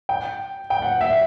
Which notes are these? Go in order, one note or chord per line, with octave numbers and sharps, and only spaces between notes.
G5
G5
F#5
E5